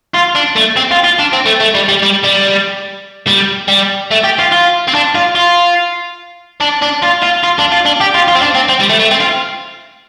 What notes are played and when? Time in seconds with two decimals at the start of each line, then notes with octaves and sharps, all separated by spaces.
0.14 F4
0.35 D4
0.56 A3
0.76 C4
0.91 F4
1.04 F4
1.19 D4
1.33 C4
1.46 A3
1.60 A3
1.75 G3
1.88 G3
2.02 G3
2.23 G3
3.27 G3
3.68 G3
4.11 A3
4.24 G4
4.39 F4
4.52 F4
4.88 C4
4.94 D4
5.15 F4
5.35 F4
6.60 D4
6.82 D4
7.03 F4
7.23 F4
7.44 F4
7.59 D4
7.72 F4
7.85 D4
8.00 G4
8.14 F4
8.28 F4
8.35 C4
8.42 D4
8.55 C4
8.69 C4
8.80 G3
8.90 A3
9.00 A3
9.12 C4
9.21 F4